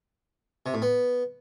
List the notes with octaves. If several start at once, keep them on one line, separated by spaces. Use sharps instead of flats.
C3
A2
B3